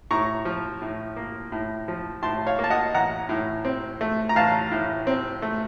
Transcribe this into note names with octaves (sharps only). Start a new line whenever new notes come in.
A2 A#5 C#6
F3
A2
A#3
A2
F3
A2 A5 C6
C#5 F5
A#3
A5
D#5 F#5
A1 F#5 A#5
A2
C4
A3
A#5
A1 F5 A5
A2
C4
A3